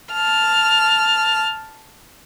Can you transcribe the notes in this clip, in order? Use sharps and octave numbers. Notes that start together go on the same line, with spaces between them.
A5 F6